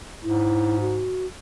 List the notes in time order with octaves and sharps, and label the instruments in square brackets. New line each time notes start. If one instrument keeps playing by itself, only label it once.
[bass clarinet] G#2 [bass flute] E4
[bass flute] F#4